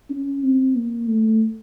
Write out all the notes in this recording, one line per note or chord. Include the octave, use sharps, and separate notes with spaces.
C#4
C4
A#3
A3